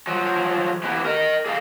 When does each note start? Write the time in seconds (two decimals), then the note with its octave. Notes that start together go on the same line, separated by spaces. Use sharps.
0.07 F3 F#3
0.84 B3 E4 G4 B4
1.05 A#4 D#5
1.46 G#4 A4 D#5 F5